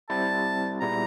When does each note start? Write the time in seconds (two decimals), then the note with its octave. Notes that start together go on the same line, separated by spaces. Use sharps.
0.10 G3 C4 E4 A5
0.80 A#2 G3 B3 E4 G#4 A#5